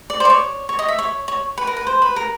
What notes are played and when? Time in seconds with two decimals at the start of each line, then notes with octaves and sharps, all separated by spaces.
0.10 D5
0.20 C5
0.25 D5
0.30 C#5
0.69 C#5
0.79 D#5
0.88 E5
0.99 C#5
1.28 C#5
1.58 B4
1.67 A#4
1.77 B4
1.87 C5
2.02 B4
2.16 A#4